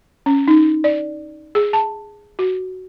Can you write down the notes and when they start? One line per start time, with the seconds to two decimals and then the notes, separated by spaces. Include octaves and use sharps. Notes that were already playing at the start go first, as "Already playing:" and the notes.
0.26 C#4
0.48 D#4
0.84 D5
1.55 G#4
1.73 A5
2.39 F#4